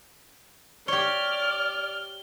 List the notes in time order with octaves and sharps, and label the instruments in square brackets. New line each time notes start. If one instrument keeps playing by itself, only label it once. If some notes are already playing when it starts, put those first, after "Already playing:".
[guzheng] G4 C#5 [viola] D5 [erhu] F6 [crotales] G7